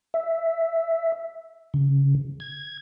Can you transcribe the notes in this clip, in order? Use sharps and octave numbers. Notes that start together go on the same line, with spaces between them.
E5
C#3
G#6